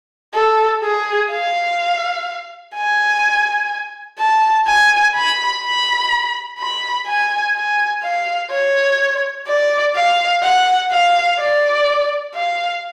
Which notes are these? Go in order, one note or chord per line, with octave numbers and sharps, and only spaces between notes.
A4
G#4
F5
G#5
A5
G#5
B5
B5
B5
G#5
G#5
F5
C#5
D5
F5
F#5
F5
D5
F5